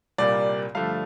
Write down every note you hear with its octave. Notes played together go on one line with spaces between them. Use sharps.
C2 A#2 G3 A#3 D5
G2 D3 F3 A3 F5